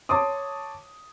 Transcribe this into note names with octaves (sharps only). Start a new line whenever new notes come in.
C#5 A5 C6 D6 D#6